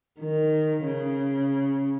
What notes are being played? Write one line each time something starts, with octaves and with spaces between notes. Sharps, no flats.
D#3
C#3